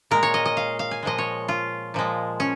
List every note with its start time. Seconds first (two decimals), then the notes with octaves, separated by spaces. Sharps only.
0.11 A#2 G#3 A#4
0.23 C#5
0.34 D#5
0.46 D#5
0.57 F5
0.79 F5
0.91 G#5
1.03 A#2 F3 G#3 D#5
1.18 C#5
1.48 F4
1.94 A#2 F3 G#3
2.40 C#4